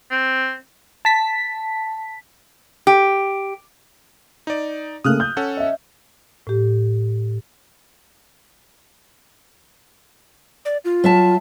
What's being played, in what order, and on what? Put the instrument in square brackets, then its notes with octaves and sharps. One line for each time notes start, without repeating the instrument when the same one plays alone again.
[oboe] C4
[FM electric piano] A5 B6
[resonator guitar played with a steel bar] G4
[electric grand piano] D#4 D5
[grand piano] C#3 A3 A#3 [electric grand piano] D#6 F6 F#6
[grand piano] G6
[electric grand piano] C#4 A4 F#5
[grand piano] D#5 E5
[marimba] A2 G4
[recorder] D5
F4
[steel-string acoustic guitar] F#3 E5 A5